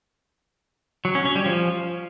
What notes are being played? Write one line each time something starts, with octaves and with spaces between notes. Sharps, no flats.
F#3
C#4
C#4
G3
F3